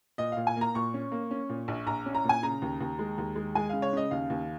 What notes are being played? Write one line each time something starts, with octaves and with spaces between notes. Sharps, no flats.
A#2 D#5
A#2 F5
G#5
A#3 A#5
A#2 C#6
C#4
A#3
C#4
A#2
A#1
A#1 A#5
C#4
A#5
A#2 G#5
C#3 A#5
D#2
D#2
G#3
D#2
G#3
G#3 G#5
C#3 F5
C#5
C#3 D#5
D#2 F5
D#2